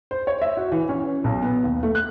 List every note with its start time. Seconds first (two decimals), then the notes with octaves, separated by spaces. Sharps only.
0.11 C5
0.27 C#5
0.42 E5
0.57 F#4
0.72 E3
0.89 C#4
1.24 B1
1.42 B3
1.64 D#2
1.83 A3
1.95 F#6